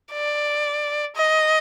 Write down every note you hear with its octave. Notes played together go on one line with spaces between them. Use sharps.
D5
D#5